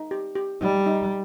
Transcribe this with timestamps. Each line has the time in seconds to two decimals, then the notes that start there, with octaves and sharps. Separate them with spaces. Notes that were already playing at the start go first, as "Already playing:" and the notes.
Already playing: D#4
0.11 G4
0.35 G4
0.61 G3 D#4
0.86 D#4